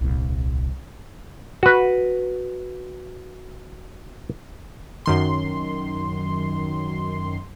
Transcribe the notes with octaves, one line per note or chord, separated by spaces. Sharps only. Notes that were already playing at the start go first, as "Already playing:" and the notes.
D#1 C2
F#4 B4
F#2 D#3 C6